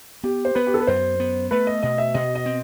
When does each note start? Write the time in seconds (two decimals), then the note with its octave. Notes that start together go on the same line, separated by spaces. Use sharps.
0.23 B3 G4
0.45 C5
0.55 B3 B4
0.67 G4
0.74 A4
0.80 B4
0.87 F#2 C5
1.20 B3
1.51 A3 B4
1.67 D#5
1.83 B2 D#5
1.98 E5
2.14 B2 D#5
2.35 D#5
2.46 C4